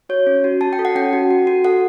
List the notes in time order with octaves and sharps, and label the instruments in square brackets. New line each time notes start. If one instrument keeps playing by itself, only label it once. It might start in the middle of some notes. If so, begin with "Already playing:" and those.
[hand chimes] F#4 C#5
C#4
F#4
F#4 A5
G5
A4
F#5
C#4 G5
F#4
F#4
F#4
A4 F#5